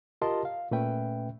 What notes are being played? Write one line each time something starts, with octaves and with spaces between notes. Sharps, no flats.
F4 G4 A#4 D#5 A5 C6
F5
A#2 A3 C#4 B4 E5 G5